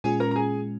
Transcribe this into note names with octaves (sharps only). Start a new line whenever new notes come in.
A#2 G#3 C#4 F4 G#4 G#5
A#4 A#5
A#5
G#4 G#5